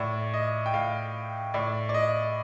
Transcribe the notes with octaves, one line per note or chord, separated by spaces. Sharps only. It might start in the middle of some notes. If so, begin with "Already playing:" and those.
Already playing: A2 D5
D#5
G5
A2 F5
A2 D5
D5
D#5